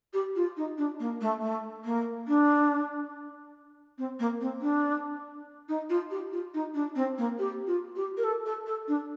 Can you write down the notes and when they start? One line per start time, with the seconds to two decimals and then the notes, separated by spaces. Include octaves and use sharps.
0.13 G4
0.36 F4
0.57 D#4
0.77 D4
0.99 A#3
1.21 A3
1.41 A3
1.84 A#3
2.27 D4
3.98 C4
4.19 A#3
4.40 C4
4.61 D4
5.68 D#4
5.89 F4
6.10 G4
6.32 F4
6.54 D#4
6.74 D4
6.95 C4
7.18 A#3
7.38 G4
7.67 F4
7.95 G4
8.17 A#4
8.23 A4
8.45 A4
8.66 A4
8.87 D4